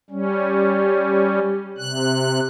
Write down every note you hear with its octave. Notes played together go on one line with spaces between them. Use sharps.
G3 C#4
C3 F#6